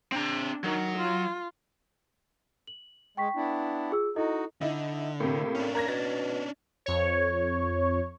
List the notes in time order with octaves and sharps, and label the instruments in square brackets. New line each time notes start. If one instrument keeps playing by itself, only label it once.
[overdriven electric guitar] C4 A#5 [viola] D4
[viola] D#3 [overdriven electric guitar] F#3
[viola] F4
[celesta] F#7
[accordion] G#3 [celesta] G5 C#6 B6
[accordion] B3 D4 E4
[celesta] F4 G#4 E6
[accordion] D#4 F#4 [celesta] E4 A4 D#5
[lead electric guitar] D3 [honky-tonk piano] D#4 E4
[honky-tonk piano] A2 C3 [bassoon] A#3
[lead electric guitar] C#4 D4
[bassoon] A#3 [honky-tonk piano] A#5 G#6 A#6
[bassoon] B2 [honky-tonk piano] A6 A#6
[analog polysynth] F2 C#5